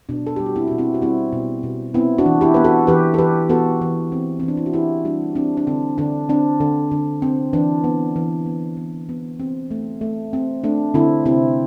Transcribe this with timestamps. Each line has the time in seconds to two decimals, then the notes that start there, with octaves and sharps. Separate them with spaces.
0.09 B2 D4
0.27 A4
0.36 G3 G4
0.46 F#4
0.56 C4 E4
0.67 B2 F#4
0.78 C4 E4
0.94 F#4
1.02 G3 C4 E4
1.32 B2
1.63 B2
1.94 B3 C4 E4
2.18 D4 F#4
2.26 E3
2.41 E4 G4
2.54 B3 B4
2.65 F#4 A4
2.87 E3 G4 B4
3.14 A4
3.18 E3 G4 B4
3.49 B3 F#4 A4
3.81 E3
4.12 C4
4.40 E3 C4
4.48 D4
4.57 E4
4.66 F#4
4.73 E3 E4 G4
5.05 G3 D4 F#4
5.36 C4 D4
5.57 D4
5.67 D3 C4
5.98 D3 D4
6.29 C4 D4
6.60 D3
6.91 D3
7.22 C4
7.53 E3 D4
7.84 B3
8.16 E3
8.46 B3
8.77 B3
9.09 B3
9.40 C4
9.71 A3
10.01 A3
10.33 C4
10.64 A3 D4
10.94 D3 C4 E4
11.26 C3 C4 E4